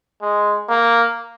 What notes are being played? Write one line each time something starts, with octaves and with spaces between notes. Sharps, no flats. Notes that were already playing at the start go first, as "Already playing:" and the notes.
G#3
A#3